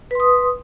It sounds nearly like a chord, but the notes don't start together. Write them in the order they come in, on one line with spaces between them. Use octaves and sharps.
B4 C6 D#6